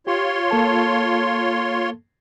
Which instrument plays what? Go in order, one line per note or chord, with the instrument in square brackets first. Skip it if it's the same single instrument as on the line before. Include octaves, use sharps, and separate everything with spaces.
[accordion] F4 C#5 C6 [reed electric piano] G4
[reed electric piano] A#3 A4 A5